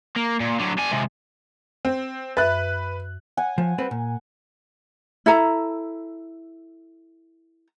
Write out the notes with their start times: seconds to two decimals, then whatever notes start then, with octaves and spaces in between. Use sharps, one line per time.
0.16 A#3
0.41 A#2
0.60 D3 F#3
0.78 D4 G#5
0.92 C3 G#3
1.85 C4
2.37 F#2 B4 E5 F#6 A6
3.37 F#5 G#5
3.58 F3
3.78 G3 C4 B4
3.91 A#2
5.26 E4 A4 A#5